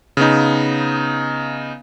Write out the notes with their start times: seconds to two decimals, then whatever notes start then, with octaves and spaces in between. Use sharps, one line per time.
0.17 C#3 B3 D#4